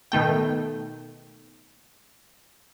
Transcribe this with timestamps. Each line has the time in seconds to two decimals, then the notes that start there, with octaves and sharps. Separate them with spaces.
0.12 B2 D#3 A3 G5